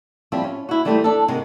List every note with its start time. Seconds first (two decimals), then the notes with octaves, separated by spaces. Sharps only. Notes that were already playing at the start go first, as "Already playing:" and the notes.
0.32 F3 G3 C4 E4
0.44 C#4
0.69 E4 F#4
0.85 E3 G3 A3 D#4 A4 C5
1.04 D4 A4
1.28 G#2 C3 D#3 G#3